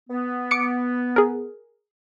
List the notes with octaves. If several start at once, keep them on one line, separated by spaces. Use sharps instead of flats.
B3
D6 C#7 D7
G#4 A#4